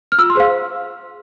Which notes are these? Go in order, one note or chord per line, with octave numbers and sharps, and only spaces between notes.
F6
F4 E6
C6
G#4 C5 F5